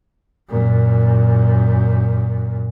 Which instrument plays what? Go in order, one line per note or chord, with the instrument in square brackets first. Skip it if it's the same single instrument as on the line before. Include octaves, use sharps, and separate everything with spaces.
[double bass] F#2 A#2